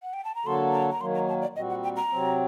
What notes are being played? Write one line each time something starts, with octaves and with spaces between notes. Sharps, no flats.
F#5
G5
A5
A#5
D3 F#3 A#3 F#4 A4 C6
A#5
A#5
D#3 F#3 A#3 C6
A#5
A5
D5
A#2 G3 C4 F#4 D#5
F#5
G5
A#5
C3 F#3 C4